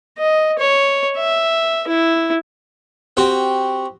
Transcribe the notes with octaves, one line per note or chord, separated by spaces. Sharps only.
D#5
C#5
E5
E4
C4 F#4 G4